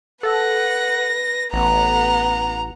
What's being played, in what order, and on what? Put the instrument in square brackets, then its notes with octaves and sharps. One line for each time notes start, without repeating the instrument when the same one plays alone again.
[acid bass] A4 [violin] B4 A#6 [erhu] F#5
[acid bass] A1 [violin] B3 F#5 [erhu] A#5